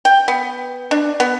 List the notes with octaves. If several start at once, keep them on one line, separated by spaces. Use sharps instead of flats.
G5
B3
D4
B3